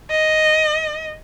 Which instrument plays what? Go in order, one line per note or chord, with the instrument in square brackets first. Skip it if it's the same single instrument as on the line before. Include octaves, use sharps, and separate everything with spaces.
[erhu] D#5